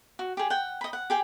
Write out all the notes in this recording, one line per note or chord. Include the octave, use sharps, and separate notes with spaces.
F#4
G4 G#4
F#5 G5
D#5 B5
F#5
G4 G#4 G5